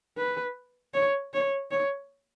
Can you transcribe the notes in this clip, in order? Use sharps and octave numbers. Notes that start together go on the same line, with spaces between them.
B4
C#5
C#5
C#5